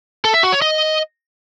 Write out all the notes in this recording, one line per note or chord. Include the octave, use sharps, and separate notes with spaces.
A4
E5
F#4
C#5
D#5